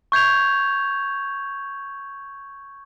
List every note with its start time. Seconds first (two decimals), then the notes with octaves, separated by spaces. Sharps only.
0.12 C#6 G6 G#6 F7